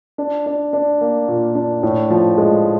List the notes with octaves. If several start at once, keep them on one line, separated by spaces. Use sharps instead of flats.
D4
D4
D4
A#3
A#2
D4
A2
F3
G#3